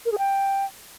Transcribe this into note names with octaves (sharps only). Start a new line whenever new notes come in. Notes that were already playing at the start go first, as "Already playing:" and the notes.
A#4
G#4
G5